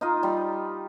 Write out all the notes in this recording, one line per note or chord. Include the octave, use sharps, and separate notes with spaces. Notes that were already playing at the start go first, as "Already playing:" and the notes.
D#4 F4 D#5
G3